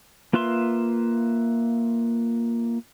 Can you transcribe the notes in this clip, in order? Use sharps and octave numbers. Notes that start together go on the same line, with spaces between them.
A#3 F4 B4 E5 C6